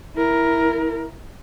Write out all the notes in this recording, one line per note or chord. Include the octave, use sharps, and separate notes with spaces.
E4 A#4